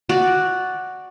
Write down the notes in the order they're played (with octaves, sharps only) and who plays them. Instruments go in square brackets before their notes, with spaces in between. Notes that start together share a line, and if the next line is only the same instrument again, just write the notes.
[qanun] F#4 D5